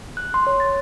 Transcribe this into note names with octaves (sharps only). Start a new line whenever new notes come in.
F#6
C6
C#5
A6